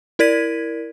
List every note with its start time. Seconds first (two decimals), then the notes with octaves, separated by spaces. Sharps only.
0.19 E4 A#4 D5 G#6 B6 D#7